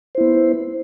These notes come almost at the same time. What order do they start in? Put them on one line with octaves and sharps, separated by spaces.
C5 E4 B3